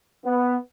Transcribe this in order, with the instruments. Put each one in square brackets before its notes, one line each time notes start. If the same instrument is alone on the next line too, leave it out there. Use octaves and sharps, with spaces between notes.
[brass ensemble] B3